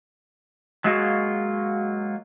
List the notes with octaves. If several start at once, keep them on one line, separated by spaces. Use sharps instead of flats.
F#3 G#3 A#3 F4 F#4 G#4